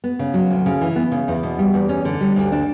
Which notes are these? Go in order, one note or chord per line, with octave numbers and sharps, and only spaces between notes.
B3
C#3
F#3
D2
C#3
E3
B3
C#3
E2
B2
G3
E2
C#4
D3
G3
D2
D4